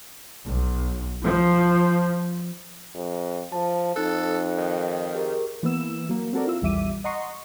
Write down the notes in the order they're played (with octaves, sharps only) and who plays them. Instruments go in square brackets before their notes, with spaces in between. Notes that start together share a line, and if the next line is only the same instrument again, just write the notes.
[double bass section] B1
F3
[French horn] F2
[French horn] F3 [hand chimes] A5
[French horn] F2 [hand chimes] D#4 F#6 [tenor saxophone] A4
[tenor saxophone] D#3
[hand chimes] G4 G#4 A#4
[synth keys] E3 A#3 B3 E6 E7
F#3 A#3
C4 F#4 A4 A#4 D5
E4 F4 E6
A#1 E2 G3 E5 D6 D#7
D#5 F#5 A#5 C6 C#6